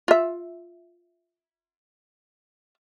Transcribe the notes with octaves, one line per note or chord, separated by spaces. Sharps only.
F4 E5